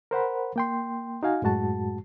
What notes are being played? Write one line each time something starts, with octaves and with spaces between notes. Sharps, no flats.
A#4 C5 F#5 B5
A#3 G5 C6
D#4 F#4 F5 G#5
F#2 A2 G#3 F#4 A5